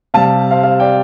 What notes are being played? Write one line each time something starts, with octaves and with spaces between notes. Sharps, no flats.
C3 G3 F5 A5
C5 F5
C5 F5
D5 G5